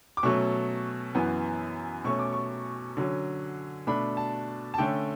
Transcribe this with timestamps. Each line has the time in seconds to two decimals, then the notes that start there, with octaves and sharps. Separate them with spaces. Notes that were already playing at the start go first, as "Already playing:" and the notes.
0.17 D6
0.23 B2 F#3 A3 C#4 C#6
1.14 F#2 E3 B3
2.05 B2 A3 C#4 C#6
2.19 D6
2.32 C#6
2.97 D3 F#3 C#4
3.87 B2 A3 D4 B5
4.17 A5
4.74 A5
4.78 D3 A3 C#4 G5